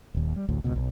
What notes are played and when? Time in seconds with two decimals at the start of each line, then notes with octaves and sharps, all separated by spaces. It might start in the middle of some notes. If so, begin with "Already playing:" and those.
0.14 D#1 D#2
0.36 G3
0.48 A1 D2 A2
0.64 D#1 G#1 C#2 B2
0.76 B1